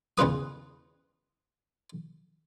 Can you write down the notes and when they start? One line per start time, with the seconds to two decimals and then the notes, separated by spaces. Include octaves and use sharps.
0.18 E2 C#3 F4 B4 D#6